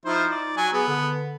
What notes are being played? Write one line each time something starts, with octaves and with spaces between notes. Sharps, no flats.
F3 D#4 E4 C5
D5
F#3 G#5
B3 G#4
D3